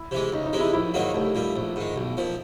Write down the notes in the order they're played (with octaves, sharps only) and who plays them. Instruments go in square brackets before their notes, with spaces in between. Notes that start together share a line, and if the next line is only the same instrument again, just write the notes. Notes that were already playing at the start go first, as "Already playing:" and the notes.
Already playing: [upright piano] E4
[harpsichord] C3 E3 G#3
[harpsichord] C#2 [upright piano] D#4
[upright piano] D#4
[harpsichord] C3 E3 G#3
[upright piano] E4
[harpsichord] A#1 [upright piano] E4
[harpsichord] G#2 D#3 F#3 A#3 [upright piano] D#4
[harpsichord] C2 [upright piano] A3
[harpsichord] A#2 G3
A#1
G#2 D#3
B1
A#2 F3